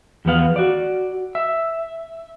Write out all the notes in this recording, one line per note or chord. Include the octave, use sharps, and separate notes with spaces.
E2 F3 B3 F5
F#4 D5
E5